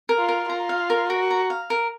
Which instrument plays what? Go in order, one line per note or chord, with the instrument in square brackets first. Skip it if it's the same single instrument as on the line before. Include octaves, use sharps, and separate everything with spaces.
[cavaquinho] A#4
[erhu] F4
[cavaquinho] A#4
[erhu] F4 [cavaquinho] A#5
[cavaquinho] F5
A#4
[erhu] F#4 [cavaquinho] A#4
[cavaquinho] A#5
F5
A#4